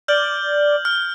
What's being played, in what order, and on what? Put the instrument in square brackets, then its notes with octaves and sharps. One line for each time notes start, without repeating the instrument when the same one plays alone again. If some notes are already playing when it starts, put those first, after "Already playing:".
[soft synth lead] D5 [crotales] F6 G6 F#7
[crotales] F6